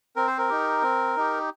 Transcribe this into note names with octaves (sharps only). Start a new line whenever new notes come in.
C4 A#4
C5
A#4
D#4 G4
C4
D#4 G4